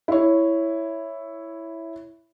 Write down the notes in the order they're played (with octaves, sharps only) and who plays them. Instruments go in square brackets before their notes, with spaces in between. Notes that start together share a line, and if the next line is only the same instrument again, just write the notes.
[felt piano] E4 C#5